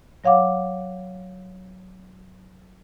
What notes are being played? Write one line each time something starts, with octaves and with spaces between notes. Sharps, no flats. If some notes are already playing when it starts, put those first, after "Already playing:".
F#3 C#5 F5 F#5 D6